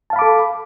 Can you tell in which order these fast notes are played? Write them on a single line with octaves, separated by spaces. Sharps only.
A5 F5 B5 D6 A4